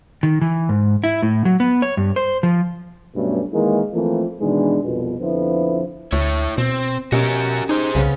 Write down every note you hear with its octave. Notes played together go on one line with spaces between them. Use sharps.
D#3
E3
G#2
E4
A2
F#3
B3
C#5
G2
C5
F3
G2 B2 F#3 A3 C#4
D#3 E3 G#3 A#3
E3 F3 A3 A#3 C4
B2 D#3 E3 G#3 D4
C2 F2 B2
F2 D3 F3 B3 E4
D2 E4 C#5
B2 C4
B2 C#4 F#4 G4 A#4 D#5
D#4 G#4 C5
C2 C#3 B3 C#4